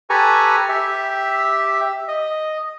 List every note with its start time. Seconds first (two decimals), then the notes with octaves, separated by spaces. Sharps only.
0.10 G4 A4 B4 G#5 A#5 C#6
0.69 G4 E5
2.08 D#5